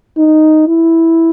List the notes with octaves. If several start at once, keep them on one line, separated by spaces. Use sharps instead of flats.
D#4
E4